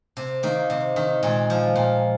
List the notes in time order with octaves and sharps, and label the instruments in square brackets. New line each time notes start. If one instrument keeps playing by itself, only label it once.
[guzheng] C3
D#3 A#3
C3
D#3
A#2 G#3
F3
A#2